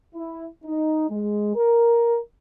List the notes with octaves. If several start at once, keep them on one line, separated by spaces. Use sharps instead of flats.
E4
D#4
G#3
A#4